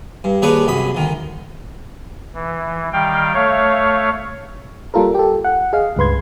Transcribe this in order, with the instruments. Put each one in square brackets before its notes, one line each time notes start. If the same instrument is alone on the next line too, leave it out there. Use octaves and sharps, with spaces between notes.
[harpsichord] G2
D#2 D4 G#4 B4 C#5
C2 F#2 B5 D#6
D2 D#3
[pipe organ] E3
D#3 G3 F5 G5
A3 C#5 F5
[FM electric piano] G3 A#3 F4 A4 A#4
G4 A4
F#5
G#4 D#5 F5
C#2 G2 B4 C6 G#6